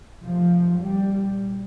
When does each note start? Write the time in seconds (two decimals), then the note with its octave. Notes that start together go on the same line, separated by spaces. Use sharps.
0.23 F1 F2 C3 F3
0.77 C2 A#2 G3